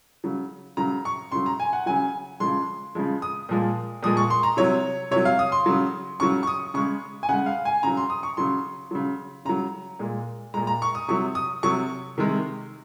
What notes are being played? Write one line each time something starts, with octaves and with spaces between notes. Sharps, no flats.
C#3 F#3
C#3 F#3 A#5
C#6
C#3 F#3 C6
A#5
G#5
F#5
C#3 F#3 G#5
C#3 F3 G#3 C6
C#3 F3 G#3
D#6
A#2 F3 G#3
A#2 F3 G#3 D#6
C#6
C6
A#5
C3 F#3 C#5
C3 F#3 C#5
F5
D#6
C6
C#3 F#3
C#3 F#3 C#6
C#6
D#6
C#3 G#3 C#6
G#5
C#3 G#3 F#5
F5
G#5
C#3 F#3 A#5
C6
D#6
C#6
C#3 F#3 C6
C#3 F#3
C#3 F#3 A#5
A#2 G#3
A#2 G#3 A#5
A#5
C#6
D#6
C3 F#3 C#6
D#6
C3 F#3 C#6
C3 D#3 G#3